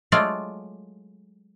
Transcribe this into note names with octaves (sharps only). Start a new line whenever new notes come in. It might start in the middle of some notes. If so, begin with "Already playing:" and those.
F#3 G#3 A3 F4 D5